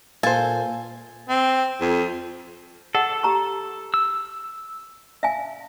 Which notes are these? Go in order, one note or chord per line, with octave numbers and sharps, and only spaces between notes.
A#2 A4 C5 F5 G#5
C4
F2
G#4 A4 F#5
G4 A#5 C#6
E6
E5 F5 G#5